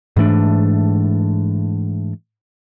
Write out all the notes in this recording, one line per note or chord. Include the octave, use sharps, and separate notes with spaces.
G#2 E3 A3 D4